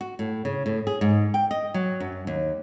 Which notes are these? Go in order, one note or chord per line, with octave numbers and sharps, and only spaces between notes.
F#4
A2
C#3
A2
G#4
G#2
G5
D#5
F#3
F#2
D#2